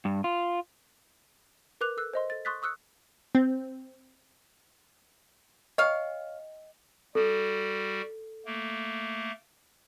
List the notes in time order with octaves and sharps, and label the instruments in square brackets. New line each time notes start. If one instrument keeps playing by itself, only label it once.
[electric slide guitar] G2
F4
[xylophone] A#4 B4 D6 F#6 F7
A4 E6 F#6
C5 D#5 C6
A4 A6
C6 C#6 D#6 F#6 A6 B6
C#6 D#6 E6 F#6 C#7
[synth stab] C4
[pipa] C#5 F5 [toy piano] D#5 G5
[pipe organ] G3 F#4 [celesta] A4
[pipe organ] A3 A#3